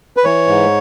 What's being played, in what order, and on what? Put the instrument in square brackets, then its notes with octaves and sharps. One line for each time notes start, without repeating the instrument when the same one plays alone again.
[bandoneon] B4
E3 C#5
G#2